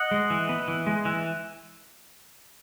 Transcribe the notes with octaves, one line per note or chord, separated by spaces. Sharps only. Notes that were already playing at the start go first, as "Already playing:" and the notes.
Already playing: D#5 F#5
G#3
E3
B3
E3
G#3
E3